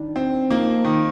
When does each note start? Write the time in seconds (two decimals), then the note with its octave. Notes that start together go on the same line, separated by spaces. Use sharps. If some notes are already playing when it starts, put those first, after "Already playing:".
Already playing: D#3 G3 D4
0.16 C4
0.50 F3 A#3 C4 D#4
0.85 D#3